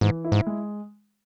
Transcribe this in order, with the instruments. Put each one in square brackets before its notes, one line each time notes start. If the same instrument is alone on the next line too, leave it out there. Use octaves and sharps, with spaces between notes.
[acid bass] G#2 [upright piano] E3
[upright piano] E4
[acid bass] G#2
[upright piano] G#3